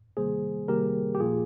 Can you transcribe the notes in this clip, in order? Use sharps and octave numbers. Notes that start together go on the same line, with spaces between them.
C3 D#3 G3 A#3 G#4 C5
C3 D#3 G3 A#3 G4 A#4
G4
A#2 F3 A#3 F4 G#4